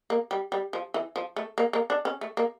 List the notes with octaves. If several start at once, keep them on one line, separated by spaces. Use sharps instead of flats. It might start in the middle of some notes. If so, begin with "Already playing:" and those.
A#3
G3
G3
F3
E3
F3
A3
A#3
A#3
D4
C#4
A3
A#3